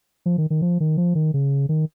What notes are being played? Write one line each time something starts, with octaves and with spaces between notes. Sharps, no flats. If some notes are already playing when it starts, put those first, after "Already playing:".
F3
D#3
D#3
F3
D#3
F3
D#3
C#3
D#3